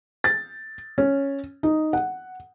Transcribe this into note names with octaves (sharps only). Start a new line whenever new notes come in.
A6
C#4
D#4
F#5